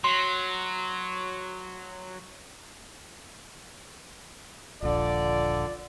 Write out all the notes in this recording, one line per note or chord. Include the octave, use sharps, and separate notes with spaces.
F#3 C6
D#1 A#1 D3 F4 D5